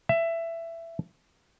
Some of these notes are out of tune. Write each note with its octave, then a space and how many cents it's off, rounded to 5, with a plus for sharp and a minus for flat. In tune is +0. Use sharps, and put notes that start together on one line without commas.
E5 +15